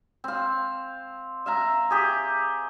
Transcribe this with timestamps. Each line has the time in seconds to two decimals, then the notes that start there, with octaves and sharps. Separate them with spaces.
0.24 C4 F5
1.46 E5 F5 A#5
1.90 G4 G#4